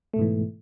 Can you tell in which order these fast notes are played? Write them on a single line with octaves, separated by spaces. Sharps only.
A3 B2 G#2 E3